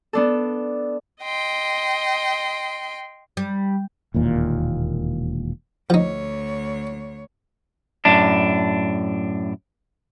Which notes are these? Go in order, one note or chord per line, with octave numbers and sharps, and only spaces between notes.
B3 D4 A4
D#5 G5 C6
G3
E1 D#2 A#2
D2 F3 D#4 C#5
F#2 A2 D4